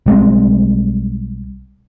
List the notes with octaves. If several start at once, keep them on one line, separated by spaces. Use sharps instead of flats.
B1 G3 G#3 C4